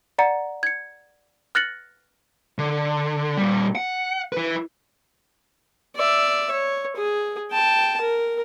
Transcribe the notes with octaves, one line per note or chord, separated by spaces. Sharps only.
D5 F#5 A#5 A6 C#7
G#6 C#7
F6 F#6 A6 A#6 C#7 F#7
D3
A#2 G3
F#5
E4 B4
D5 E5
C#5
G#4
G5 A5
A#4